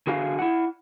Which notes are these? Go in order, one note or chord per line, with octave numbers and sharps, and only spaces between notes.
D3 F#4 G#4 F5
E4 F#5